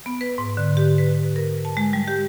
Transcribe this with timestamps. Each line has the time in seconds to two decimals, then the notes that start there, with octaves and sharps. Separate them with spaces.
0.06 B3
0.21 B4
0.38 G#2
0.57 D3
0.77 G4
0.98 B4
1.36 A#4
1.65 A5
1.77 G#3
1.93 G3
2.08 G4